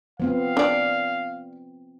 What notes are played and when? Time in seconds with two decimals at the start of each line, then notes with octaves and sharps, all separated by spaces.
0.20 F3 B3 C4 F5
0.57 D4 D5